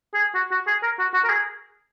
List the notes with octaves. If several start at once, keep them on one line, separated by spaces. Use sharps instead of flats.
G#4
F#4
F#4
G#4
A#4
F#4
F#4
A#4
G#4